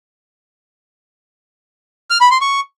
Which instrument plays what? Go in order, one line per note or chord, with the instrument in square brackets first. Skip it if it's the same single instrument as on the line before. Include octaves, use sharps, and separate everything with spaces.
[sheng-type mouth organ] F6
B5
C6
C#6